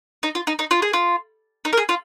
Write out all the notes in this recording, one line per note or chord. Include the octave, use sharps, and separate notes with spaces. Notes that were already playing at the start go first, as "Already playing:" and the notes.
D#4
F4
D#4
D#4
F4
G#4
F4
D#4
A#4
G#4
F4